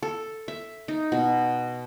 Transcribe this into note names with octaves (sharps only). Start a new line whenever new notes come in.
A4
E5
D#4
B2